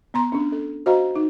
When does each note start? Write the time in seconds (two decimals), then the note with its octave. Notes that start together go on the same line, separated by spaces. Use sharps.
0.14 B3 A#5 C6
0.32 C#4 D4
0.52 A4
0.86 F#4 C5 D#5 F5 A#5
1.16 D#4